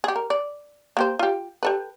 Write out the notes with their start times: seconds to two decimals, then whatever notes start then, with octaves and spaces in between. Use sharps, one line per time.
0.04 G4 G#4
0.16 A#4
0.30 D5
0.97 A#3 G4 C5
1.19 F4 G4
1.63 G4 A4 B4